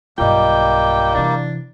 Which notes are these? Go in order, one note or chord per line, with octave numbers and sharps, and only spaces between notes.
B1 G2 G3 A#3 F4 D#5 G5
C3 E3 D4